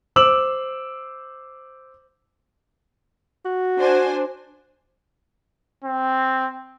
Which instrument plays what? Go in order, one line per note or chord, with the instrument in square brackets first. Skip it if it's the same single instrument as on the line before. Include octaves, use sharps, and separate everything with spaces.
[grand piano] C5 D6 E6 F#7
[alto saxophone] F#4
[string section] D4 C5 G#5
[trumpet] C4